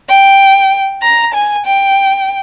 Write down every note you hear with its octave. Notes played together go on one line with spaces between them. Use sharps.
G5
A#5
G#5
G5